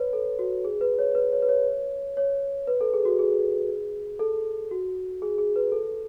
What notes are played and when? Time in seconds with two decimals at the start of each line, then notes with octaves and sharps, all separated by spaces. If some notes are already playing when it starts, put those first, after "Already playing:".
Already playing: B4 C#5
0.13 A4
0.39 F#4
0.64 G#4
0.81 B4
0.99 C#5
1.15 B4
1.32 C#5
1.42 B4
1.49 C#5
2.17 C#5
2.67 B4
2.81 A4
2.93 G#4
3.05 F#4
3.19 G#4
4.19 A4
4.71 F#4
5.22 G#4
5.38 G#4
5.56 B4
5.72 A4